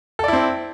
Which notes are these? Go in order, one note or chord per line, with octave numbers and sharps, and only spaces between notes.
C4 E4 A4 D5